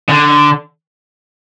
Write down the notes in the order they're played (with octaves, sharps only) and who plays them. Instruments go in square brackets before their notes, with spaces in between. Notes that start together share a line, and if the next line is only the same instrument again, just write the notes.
[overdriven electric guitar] D3